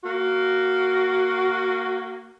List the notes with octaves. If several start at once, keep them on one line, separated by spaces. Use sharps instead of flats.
A#3 F#4